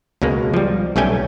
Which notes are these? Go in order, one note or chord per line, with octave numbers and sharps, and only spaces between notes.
C#2 B2 G#3 A#3
F3 G3
B1 G3 A3 C#4 G5 G#5